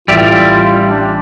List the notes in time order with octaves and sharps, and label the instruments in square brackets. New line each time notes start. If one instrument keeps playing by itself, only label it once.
[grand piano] A1 F7 [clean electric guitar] G3 D5 E5 [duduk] F4
[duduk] D4